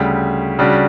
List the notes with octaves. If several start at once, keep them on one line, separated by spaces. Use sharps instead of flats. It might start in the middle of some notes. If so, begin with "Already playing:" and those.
Already playing: D2 C#3 G3
C#3 G3 D4 F#4